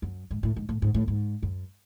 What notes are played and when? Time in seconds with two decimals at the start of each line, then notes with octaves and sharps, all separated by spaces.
0.02 F#2
0.31 G#2
0.43 A2
0.56 G#2
0.69 A2
0.82 G#2
0.94 A2
1.08 G#2
1.43 F#2